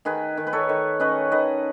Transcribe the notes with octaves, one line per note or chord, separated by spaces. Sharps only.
D#3 G#4 B4
D#3
B4
A4 C#5
D#3
C#4 B4 D#5
D#3 B4 D#5